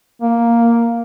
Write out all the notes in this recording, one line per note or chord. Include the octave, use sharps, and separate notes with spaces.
A#3